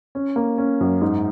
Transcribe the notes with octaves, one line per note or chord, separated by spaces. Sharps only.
C#4
A#3
C#4
F#2
G#2